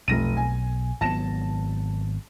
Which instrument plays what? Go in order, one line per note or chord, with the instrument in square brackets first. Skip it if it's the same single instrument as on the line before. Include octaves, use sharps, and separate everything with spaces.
[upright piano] F1 A#6 D#7 [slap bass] B1
[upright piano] G#5
[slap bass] G#1 F#3 B3 [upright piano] A5 A#6 E7